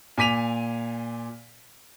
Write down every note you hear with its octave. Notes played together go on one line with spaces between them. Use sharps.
A#2 G#5 D6 B6 D#7 F7